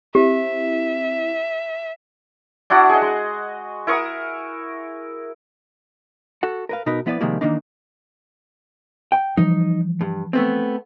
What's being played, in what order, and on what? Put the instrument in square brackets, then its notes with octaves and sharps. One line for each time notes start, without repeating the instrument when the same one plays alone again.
[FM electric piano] C4 E4 [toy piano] G4 [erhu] E5
[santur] D4 E4 F#4 F#5
G#4 D#5
G#3
E4 A#4 C#6 D#6
[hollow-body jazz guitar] F#4 A4 F#5
A#4 B4 F5
B2 D#4 A#4 B4
F3 B3 E4 B4 D5
C3 D#3 F3 G3 G#3 A#3
D#3 E3 A#3 D4 D#4
G5
[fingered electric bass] E3 F3 G3 [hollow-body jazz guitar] D#4
[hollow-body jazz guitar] G2
A3 B3 C4